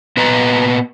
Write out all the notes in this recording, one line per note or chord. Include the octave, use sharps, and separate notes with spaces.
A#2 B3 B4 D#5 A#5